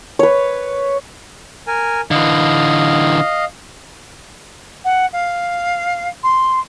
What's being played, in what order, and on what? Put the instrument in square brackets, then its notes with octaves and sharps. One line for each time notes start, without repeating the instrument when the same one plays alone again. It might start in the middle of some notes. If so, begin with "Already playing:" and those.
[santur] B4 C#5
[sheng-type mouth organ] A#4 G#5
[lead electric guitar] D3 E3 [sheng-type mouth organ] D#5 F5
[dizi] F#5
F5
C6